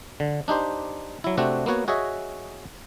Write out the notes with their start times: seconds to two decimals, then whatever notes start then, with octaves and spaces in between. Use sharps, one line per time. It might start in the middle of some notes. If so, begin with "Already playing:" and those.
0.20 D3
0.48 D4 D#4 G4 C5
1.24 F#3 E4
1.37 C3 A3 C4 D4 F#4
1.66 A#3 B3 F#4 C#5
1.88 F#4 G#4 C#5 D#5 E5